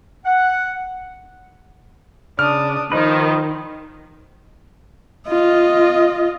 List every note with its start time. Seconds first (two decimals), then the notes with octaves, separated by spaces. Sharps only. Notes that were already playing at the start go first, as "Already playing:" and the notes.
0.24 F#5
2.39 C#3 D4 D#6 F6
2.92 D#3 F3 D#4 B4 C5
5.28 F4 D#5